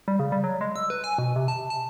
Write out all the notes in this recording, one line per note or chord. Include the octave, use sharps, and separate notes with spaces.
G3
C#3
G3
F#3
G#3
E6
B4
G#5
B2
C3
A5
A5